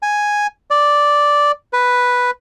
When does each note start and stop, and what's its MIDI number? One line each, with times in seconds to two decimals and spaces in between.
0.02 0.47 80
0.71 1.52 74
1.73 2.31 71